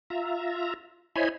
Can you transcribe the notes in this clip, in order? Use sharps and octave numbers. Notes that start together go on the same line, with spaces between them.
F4 E5 A#5
E4 C5 C#5 D#5 G#5 B5